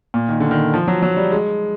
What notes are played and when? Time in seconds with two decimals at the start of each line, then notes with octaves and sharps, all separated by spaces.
0.14 A#2
0.29 D#3
0.40 D3
0.51 D#3
0.74 F3
0.88 F#3
1.02 F#3
1.17 G3
1.32 G#3